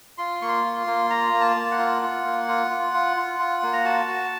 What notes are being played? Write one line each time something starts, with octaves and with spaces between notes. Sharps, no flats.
F4 C6
A#3 C#6
C6
F4
C6
A#3
F4 A#5
A#3
A5
A#3
F#5
F4
F4
A#3
F4
F4
F4
F4
F4
A#3
A#5
F#4 A5
F#4